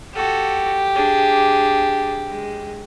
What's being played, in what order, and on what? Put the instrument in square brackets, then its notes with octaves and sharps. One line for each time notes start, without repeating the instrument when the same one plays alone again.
[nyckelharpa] F#4 A4 [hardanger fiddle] G4
[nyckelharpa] D4 G#4
G#3